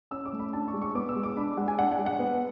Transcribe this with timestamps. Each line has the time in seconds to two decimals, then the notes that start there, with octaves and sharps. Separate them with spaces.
0.11 C#4 E6
0.25 D6
0.33 A3
0.39 B5
0.53 D4 A5
0.68 C#6
0.74 G#3
0.82 C#6
0.95 B3 D6
1.09 E6
1.16 G#3
1.23 D6
1.37 D4 B5
1.57 G#3 F#5
1.68 G#5
1.79 D4 F#5
1.92 F#5
1.99 G#3
2.06 F#5
2.19 B3